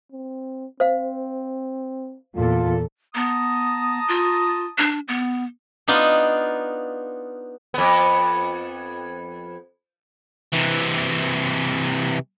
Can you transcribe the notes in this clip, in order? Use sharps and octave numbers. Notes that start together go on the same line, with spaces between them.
C4
C4 C5 F5
E2 A#2 F4 A4
B3 A5 A#5 D#6
F4
D4
B3
B3 D4 D#4 F4
F2 B3
C3 E3